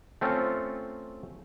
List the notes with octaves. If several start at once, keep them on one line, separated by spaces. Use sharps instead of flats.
A3 C4 C#4 F4